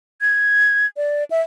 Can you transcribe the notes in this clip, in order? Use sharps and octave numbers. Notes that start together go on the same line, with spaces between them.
G#6
D5
E5